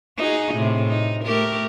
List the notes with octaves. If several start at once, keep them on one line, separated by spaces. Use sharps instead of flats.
D#4 F#4 G#4
A2 C3
D#4
A3 G4 A#4